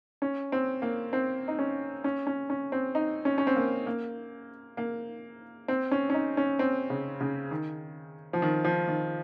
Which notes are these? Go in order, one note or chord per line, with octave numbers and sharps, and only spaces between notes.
C#4
C4
A#3
C4
D#4
C#4
C#4
C#4
C#4
C4
D#4
C#4
C#4
C4
A#3
A#3
A#3
C4
C#4
C#4
D#4
C#4
C4
C#3
C#3
D#3
F3
D#3
F3
D#3